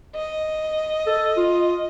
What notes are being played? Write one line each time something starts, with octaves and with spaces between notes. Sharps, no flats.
D#5
A4
F4